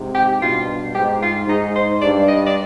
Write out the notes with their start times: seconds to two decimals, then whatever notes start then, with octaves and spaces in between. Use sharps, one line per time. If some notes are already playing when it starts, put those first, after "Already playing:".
Already playing: G#2 C3
0.15 G4
0.41 G2 B2 F4
0.95 G#2 G4
1.22 F4
1.48 G#2 D#4
1.76 C5
2.01 G2 D5
2.28 D#5
2.46 D5